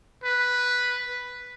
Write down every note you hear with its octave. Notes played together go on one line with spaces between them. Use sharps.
B4